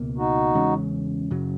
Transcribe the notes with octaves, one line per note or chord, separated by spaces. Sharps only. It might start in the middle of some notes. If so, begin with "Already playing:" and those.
Already playing: C#2 B2 A#3
D#4 F#4
E2 C#3 G#3 C#4
F#2 C#3 F#3